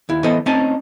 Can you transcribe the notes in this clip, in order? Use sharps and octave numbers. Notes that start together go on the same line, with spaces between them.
D#2 E4
E3 B3 A4 C5 D#5
A3 C4 C#4 D#4 G#5 A5